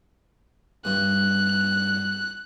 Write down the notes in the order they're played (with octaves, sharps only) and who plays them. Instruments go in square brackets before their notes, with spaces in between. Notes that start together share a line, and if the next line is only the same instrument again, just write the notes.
[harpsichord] G2 [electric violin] F#6